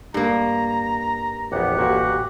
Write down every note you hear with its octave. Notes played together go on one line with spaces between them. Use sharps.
G2 A#3 A#5
A#1 E2 B3 G4 F#5
A1 A#2 E4 F#4